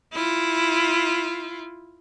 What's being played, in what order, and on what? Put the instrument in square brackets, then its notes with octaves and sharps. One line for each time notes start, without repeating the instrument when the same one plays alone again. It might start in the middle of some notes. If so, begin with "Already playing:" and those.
[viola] E4 F4